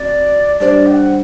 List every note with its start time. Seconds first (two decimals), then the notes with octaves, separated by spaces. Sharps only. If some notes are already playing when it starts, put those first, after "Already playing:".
Already playing: C4 F#4 D5
0.60 G3 D4 G4 C5 D5
0.87 G5
0.91 F#5